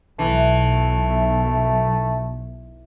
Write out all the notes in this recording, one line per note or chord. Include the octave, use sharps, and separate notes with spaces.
B1 E3 A3